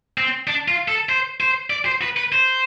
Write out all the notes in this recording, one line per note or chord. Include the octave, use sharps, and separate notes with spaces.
C4
D4
F4
A4
C5
C5
D5
C5
B4
B4
C5